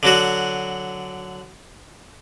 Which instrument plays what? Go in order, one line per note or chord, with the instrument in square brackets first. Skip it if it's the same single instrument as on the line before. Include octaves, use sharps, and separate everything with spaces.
[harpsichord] D3 F#3 F#4